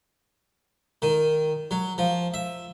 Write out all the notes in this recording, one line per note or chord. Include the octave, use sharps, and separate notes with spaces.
D#3
F#3
F3
E5